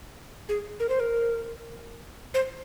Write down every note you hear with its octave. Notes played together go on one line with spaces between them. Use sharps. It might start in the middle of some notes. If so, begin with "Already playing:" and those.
G#4
A#4
C5
A#4
C5